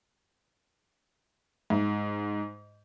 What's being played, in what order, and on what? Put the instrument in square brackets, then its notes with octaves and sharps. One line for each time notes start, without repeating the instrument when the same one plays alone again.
[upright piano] G#2